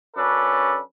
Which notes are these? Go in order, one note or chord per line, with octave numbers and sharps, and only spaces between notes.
F#2 C#4 D4 A4 B4